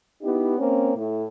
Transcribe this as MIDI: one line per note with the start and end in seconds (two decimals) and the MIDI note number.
0.22 0.56 59
0.22 0.56 63
0.22 0.56 64
0.22 0.56 67
0.58 0.95 58
0.58 0.95 60
0.58 0.95 61
0.96 1.24 45